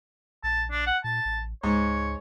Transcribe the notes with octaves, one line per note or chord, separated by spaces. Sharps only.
A#1 A5
D4
F#5
A#2 A5
A1
C#2 G#2 C#5